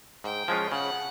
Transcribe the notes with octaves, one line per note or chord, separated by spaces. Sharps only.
G#2 G5
F3 G#3 C#4 F4
C#3 F#5